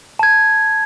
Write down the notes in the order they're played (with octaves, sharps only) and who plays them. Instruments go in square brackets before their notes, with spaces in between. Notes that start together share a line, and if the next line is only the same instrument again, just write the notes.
[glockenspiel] A5 G#6